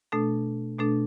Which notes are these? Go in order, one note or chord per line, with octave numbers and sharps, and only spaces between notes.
B2 A3 D4 A4
B2 A3 D4 A4